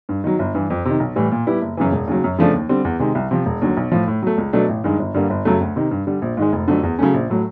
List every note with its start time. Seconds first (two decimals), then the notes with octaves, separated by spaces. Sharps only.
0.09 G2
0.24 D#3 F#3
0.39 G1
0.54 G2 E3
0.70 F2
0.85 C3 D#3
1.00 B1
1.16 A2 E3 G3
1.32 A#2
1.47 G3 B3 E4 G4
1.61 F#1
1.77 F#2 C#3 E3
1.92 E1
2.07 D#2 C#3 F#3
2.24 F#2
2.39 C#3 F3 A3 D4
2.54 D#2
2.69 D3 G3 C4
2.85 E2
2.99 C3 D#3 G#3
3.15 C2
3.31 C3 F3
3.46 E1
3.62 D#2 D3 F#3
3.77 B1
3.92 A2 F3
4.08 A2
4.22 F#3 A3
4.38 C#2
4.53 B2 F#3 A3 D4
4.69 A1
4.84 G2 D#3 G#3
4.99 G1
5.14 G2 D3 G3 A#3
5.30 G1
5.45 F#2 C#3 F#3 A3
5.61 D2
5.76 C3 D#3
5.91 G2
6.07 D3 G3
6.22 A#1
6.37 G#2 D#3 G#3
6.52 F1
6.68 F2 D3 F#3 A3
6.83 E2
6.99 C#3 F#3 A3 C#4
7.14 A#1
7.30 A2 F#3 A3